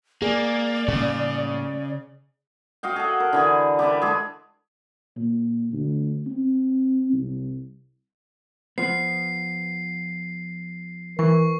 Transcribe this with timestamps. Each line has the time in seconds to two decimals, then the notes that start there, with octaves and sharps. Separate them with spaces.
0.22 A#3 G#4 D5
0.88 A2 C#3 G3 A#3
2.83 F#4 D#5 F5 G5
2.96 G#4 A4 F#5
3.20 A#4
3.33 D3 E3 G#4
3.79 G4 B4 D5 E5
4.01 G#3 G#4 A4
5.16 A#2
5.73 D2
6.26 C4
7.13 C2
8.78 F3 B3 C7
11.19 E3 A#4 C#6